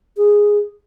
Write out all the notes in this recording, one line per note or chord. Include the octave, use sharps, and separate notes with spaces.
G#4